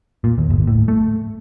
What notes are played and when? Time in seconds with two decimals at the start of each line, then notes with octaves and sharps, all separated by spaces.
0.24 A#2
0.38 D#2
0.50 G1
0.67 A2
0.88 A3